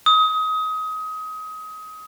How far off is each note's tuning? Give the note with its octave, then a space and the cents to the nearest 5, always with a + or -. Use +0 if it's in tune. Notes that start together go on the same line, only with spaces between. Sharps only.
D#6 +25